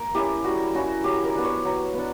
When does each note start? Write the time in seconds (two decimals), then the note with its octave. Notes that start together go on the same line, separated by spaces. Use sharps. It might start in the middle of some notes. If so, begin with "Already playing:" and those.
Already playing: A#3 A#4
0.15 C#4 E4 G4
0.44 G3 F#4
0.75 C#4 E4 F#4
1.04 F#3 G4
1.24 A#4
1.35 B3 D4
1.45 C#5
1.65 F#3
1.94 B3 D4